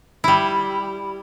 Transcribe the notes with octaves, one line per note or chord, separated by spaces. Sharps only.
G3 E4